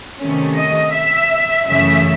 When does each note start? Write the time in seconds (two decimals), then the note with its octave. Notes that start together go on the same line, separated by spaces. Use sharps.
0.18 C3 D#3 A3 C#4
0.55 D#5
0.93 E5
1.67 F#2 C#3 E3 A3 C#4 E5